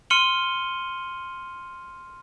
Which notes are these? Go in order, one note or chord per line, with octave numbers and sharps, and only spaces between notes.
C6 F6 C#7 D#7 F#7 G7